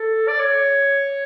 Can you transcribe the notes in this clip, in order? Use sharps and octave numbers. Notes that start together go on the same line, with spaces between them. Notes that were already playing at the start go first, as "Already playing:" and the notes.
Already playing: A4
D5
C#5